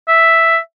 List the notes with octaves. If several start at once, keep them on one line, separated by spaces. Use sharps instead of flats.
E5